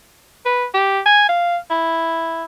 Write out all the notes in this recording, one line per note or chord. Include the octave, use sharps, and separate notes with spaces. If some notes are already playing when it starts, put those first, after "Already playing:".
B4
G4
G#5
F5
E4